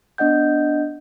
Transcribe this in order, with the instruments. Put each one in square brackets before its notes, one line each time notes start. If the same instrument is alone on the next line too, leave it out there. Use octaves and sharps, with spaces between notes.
[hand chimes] B3 D4 D#5 F#5 G6